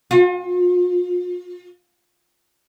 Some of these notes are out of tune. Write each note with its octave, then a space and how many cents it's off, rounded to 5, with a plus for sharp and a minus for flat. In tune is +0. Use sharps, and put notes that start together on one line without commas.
F4 +40